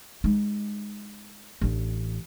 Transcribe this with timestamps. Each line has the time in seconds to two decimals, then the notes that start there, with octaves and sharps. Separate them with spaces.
0.24 G#3 D#4
1.61 A1 D4